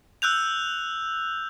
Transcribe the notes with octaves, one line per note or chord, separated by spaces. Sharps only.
E6 F#6 G6 F7